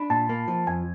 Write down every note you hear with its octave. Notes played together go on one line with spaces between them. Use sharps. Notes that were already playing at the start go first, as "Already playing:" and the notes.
Already playing: D4 B5
A#2 A5
A#3
F3
F2 G#5